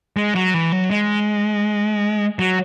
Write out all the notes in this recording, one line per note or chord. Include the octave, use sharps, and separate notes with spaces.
G#3
F#3
E3
F#3
G#3
F#3